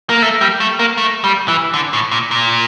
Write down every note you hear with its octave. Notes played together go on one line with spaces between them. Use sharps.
A#3
A3
G3
A3
A#3
A3
G3
E3
D3
A2
A#2
A#2